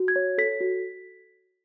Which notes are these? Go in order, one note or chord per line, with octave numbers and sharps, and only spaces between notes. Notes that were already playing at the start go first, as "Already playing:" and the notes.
Already playing: F#4
G#6
C#5
A4 B6
F#4